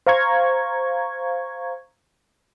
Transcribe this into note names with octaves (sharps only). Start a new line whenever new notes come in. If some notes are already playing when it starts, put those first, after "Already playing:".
C5 F5 A#5 C#6 G#6